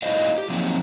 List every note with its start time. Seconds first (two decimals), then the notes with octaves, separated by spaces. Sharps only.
0.02 D#4 E4 F#4 C5 D#5 F5
0.38 G4
0.50 F3 F#3 A#3 C4 D#4